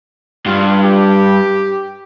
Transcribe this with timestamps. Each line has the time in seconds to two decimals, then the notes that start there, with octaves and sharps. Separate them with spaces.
0.46 G2 F4
0.83 G4